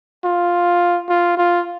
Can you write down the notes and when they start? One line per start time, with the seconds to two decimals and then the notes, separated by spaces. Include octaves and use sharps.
0.25 F4
1.09 F4
1.38 F4